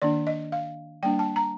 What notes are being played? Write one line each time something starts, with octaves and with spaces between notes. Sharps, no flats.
D#3 A#3 D4 D5
D#5
F5
G3 A#3 D4 G5
A5
A#5